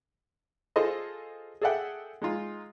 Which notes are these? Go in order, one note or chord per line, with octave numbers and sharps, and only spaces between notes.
F4 G#4 A4 C5 D#5
G#4 A4 D5 E5 F#5 G5
G#3 D#4 F4